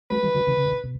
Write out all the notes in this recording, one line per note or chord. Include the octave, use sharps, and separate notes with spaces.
F#3 A3 B4
E3 G3
D3 F#3
C#3 E3
C#3
B2 D3
B2